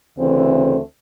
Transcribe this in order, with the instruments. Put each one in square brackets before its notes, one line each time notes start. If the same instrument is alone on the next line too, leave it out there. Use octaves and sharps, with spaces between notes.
[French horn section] D2 C#3 E3 A3 C4